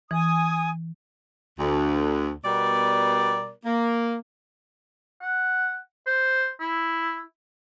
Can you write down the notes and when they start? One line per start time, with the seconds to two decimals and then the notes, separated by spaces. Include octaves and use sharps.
0.11 E3 G#5 D#6
1.60 D2
2.45 B2 G3 B3 A#4 D5
3.66 A#3
5.22 F#5
6.07 C5
6.60 E4